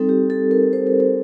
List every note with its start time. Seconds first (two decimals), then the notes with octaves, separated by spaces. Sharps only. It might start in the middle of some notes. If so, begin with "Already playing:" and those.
Already playing: G3 C4 D#4 A4
0.09 G4
0.30 A4
0.51 A#4
0.73 C5
0.87 A#4
1.00 C5